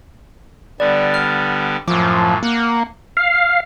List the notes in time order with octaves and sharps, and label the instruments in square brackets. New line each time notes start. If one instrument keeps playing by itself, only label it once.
[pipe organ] D3 G3 B3 [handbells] D5
[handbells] F6
[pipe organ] F#2 A2 [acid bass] F3 [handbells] D6
[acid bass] A#3 [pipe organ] F#5
[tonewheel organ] F5